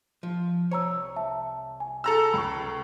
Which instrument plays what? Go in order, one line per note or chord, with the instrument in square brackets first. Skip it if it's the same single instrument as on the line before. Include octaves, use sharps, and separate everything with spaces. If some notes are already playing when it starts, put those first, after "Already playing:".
[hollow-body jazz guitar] F3
[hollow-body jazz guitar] C2 C#5 [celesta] C5 A#5 E6
[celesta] E5 A5
G#5
[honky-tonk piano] A4 A#5 E6
[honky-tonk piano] C#2 [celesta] B5 C#6